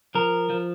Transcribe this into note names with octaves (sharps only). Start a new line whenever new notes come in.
F3 A#4
F3